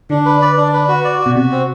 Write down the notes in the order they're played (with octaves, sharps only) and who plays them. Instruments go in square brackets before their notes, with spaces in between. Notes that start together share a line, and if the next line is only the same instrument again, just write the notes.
[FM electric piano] D3 [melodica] D4
[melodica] B4
D5
D4
B4
F#4
D5
F#4
[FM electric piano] B2
[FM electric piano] C3 [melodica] F#4
[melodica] C4